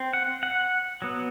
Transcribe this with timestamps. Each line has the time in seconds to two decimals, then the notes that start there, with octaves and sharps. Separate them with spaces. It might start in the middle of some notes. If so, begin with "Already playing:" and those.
Already playing: C4
0.13 F#5
0.43 F#5
1.02 F#3 B3